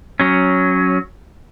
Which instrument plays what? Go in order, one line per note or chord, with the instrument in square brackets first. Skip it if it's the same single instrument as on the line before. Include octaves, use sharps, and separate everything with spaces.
[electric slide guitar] F#3 C#4